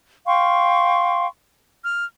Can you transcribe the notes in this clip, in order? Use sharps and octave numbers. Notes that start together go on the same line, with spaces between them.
F5 G5 C6 C#6
F6